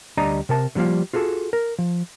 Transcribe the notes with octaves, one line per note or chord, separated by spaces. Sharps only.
D2 G3 D4 D5 D#5 A#5
C3 A#4 A5
D3 F3 G3 A#3 F4
F4 F#4 G#4 A4
A#4
F3